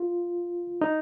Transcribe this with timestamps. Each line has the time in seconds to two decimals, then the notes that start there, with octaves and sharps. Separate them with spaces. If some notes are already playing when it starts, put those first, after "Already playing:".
Already playing: F4
0.81 D#4